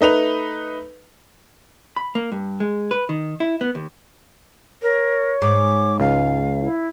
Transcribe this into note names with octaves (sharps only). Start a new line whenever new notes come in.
A3 D#4 B4 F7
B5
A#3
G2
G#3
B4
D#3
E4
B3
D#2
A#4 C#5
G#2 D6
C#2 F5
E4